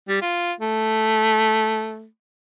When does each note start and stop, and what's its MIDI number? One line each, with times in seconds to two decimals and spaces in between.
0.09 0.19 55
0.22 0.53 65
0.60 2.07 57